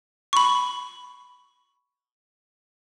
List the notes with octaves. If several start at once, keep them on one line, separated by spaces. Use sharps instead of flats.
B5 C#6